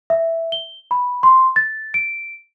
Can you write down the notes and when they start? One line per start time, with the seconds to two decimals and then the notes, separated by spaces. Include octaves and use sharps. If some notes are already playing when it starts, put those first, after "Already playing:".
0.10 E5
0.52 G7
0.91 B5
1.23 C6
1.56 A6
1.94 D7